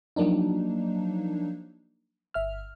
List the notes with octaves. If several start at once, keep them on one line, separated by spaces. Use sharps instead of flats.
F3 F#3 A#3 D4 D#4
G1 E5 F6